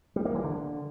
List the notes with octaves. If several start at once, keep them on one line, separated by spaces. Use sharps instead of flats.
G3
A#3
E3
D3